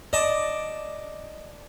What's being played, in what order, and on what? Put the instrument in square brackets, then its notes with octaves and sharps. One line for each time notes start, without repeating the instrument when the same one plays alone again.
[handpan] D5 [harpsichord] D#5 A5